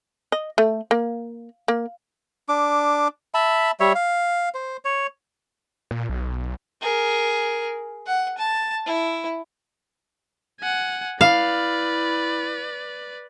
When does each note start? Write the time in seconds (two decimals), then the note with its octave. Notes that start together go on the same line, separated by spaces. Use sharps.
0.32 D#5
0.58 A3
0.91 A#3
1.68 A#3
2.49 D4 D6
3.34 E5 A5 B5
3.80 G3 C#5 E5
3.95 F5
4.54 C5
4.85 C#5
5.91 A#2
6.09 B1
6.81 G#4 A#4
8.07 F#5
8.38 A5
8.86 E4
10.60 F#5 G#5
11.21 E4 B4 D5 F5